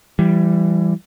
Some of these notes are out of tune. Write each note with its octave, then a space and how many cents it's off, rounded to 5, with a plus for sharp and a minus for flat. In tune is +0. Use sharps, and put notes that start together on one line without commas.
E3 +30 G3 +0